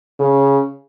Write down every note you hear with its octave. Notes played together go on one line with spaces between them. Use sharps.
C#3